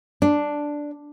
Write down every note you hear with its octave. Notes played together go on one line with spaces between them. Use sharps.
D4